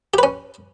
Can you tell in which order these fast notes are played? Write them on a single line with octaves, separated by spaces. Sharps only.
G4 B4 C#4